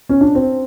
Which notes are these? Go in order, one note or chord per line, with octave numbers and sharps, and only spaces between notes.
C#4
D4
C4